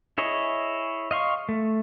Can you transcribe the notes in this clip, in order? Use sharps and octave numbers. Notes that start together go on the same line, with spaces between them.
E4 G#4 C#5 D#5
D#5 F5 C6 C#6
A3